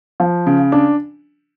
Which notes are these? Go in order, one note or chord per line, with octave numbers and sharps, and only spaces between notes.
F3
C#3
D4